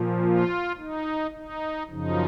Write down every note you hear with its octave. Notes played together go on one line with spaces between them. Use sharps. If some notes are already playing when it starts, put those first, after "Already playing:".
Already playing: A#2 F3
F4
D#4
D#4
F#2 C#3 F3 D#4